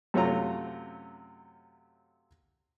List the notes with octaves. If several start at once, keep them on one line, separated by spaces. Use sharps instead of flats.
F#2 C3 A3 C#4 F4 A#5